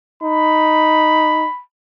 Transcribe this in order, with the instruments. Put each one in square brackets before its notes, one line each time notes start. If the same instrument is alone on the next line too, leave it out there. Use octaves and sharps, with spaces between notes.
[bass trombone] D#4 [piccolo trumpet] B5